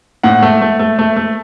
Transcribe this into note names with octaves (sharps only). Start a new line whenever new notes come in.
A2 F#5
A3
A3
A3
A3
A3